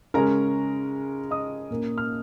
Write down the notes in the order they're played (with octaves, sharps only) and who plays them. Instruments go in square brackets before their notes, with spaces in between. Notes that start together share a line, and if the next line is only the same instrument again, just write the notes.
[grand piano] C#3 G#3 C#4 A#4 A#5
D#5 D#6
A#2 A#3 C#4
F6